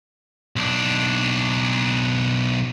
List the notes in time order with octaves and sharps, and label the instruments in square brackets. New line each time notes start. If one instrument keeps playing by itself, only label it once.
[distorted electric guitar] B1 D4